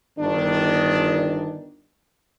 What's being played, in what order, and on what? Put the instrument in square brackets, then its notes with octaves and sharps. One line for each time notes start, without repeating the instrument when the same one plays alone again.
[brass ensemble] G1 D#3 D4